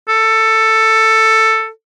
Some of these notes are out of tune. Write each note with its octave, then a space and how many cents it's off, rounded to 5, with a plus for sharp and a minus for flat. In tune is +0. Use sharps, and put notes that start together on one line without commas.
A4 +10